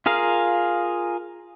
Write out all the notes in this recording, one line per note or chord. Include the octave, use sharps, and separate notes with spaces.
F4 G#4 A#4 F5